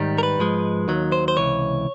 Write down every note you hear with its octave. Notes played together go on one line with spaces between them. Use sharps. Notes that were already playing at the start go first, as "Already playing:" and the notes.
Already playing: G#2 D#3 G3
A#4
B4
G#2 F3 G#3
D#2 D#3 F#3
C5
C5
C#2 C3 E3 C#5